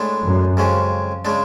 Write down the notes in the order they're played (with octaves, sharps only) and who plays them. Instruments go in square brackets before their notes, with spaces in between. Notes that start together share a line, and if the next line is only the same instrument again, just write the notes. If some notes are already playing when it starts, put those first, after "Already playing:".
Already playing: [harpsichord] A2 G#3 D4
[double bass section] F#2
[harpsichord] F2 C#3 G#3 C#4
C#3 G#3 D4